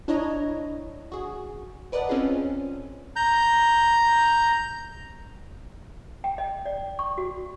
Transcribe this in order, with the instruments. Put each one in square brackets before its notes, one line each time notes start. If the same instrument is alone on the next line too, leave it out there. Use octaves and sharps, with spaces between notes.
[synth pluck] D4 E4 C#5 D#5 A#5
F#4 G#4
A#4 B4 D5 D#5 F#5 A5
C4 C#4 F4 G#4
[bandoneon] A#5 G6
[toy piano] G5
D#5
D5
C#6
F#4